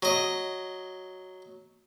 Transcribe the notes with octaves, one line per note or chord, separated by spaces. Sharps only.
F#3 D#5